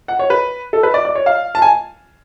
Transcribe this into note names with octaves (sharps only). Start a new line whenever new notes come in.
F#5
C#5
B4
A4
B4
D5
D5
C#5
F5
A5
G#5